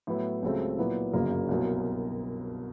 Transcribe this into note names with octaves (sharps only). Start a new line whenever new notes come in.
A2 F#3 B3 E4
C#2 C#3 F#3 A3 C4
A#2 F#3 B3 E4
G1 F#2 C#3 F#3 A#3
C2 B2 F#3 A#3